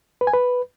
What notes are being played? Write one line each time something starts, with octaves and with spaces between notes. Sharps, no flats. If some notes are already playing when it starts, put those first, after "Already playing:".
B4
G#5
B4